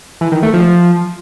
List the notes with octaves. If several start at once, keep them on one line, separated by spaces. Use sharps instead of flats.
E3
D#3
A3
F3